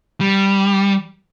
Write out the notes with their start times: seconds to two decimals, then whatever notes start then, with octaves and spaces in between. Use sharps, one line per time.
0.21 G3